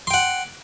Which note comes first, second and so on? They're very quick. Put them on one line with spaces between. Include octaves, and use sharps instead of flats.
C6 G5 F#5